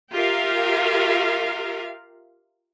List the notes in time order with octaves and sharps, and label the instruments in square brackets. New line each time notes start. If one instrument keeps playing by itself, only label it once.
[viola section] F4 G4 A#4 E5 F5